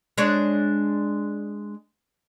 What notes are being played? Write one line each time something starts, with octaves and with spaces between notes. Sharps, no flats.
G#3 D4 C#5